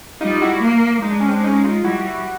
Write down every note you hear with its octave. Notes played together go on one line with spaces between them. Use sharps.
G3 D#4 F4
E4 F#4
A#3
G#3 D#4
D4
C#4
C4 D4
C#4 D#4
D#4 F4
G3 E4 F#4